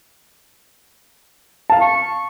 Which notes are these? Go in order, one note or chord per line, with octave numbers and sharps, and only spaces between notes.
F5 A5
C#6